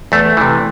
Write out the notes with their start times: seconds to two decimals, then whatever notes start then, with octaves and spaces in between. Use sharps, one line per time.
0.12 E2 A3
0.37 C3 E3